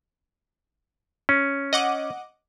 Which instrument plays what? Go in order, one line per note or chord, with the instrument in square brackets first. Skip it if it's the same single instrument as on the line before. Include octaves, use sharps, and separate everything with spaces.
[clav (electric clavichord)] C#4
[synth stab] D#5 F#5 D6